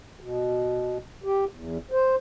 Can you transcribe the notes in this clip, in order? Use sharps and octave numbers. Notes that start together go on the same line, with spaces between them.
B2
G4
E2
C5